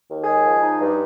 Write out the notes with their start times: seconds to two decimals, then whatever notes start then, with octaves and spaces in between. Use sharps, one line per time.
0.09 D#2
0.20 G#4
0.26 G#3
0.44 F3
0.62 D#4
0.80 G2